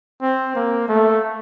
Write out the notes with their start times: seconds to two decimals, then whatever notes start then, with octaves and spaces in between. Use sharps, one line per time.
0.22 C4
0.55 A#3
0.88 A3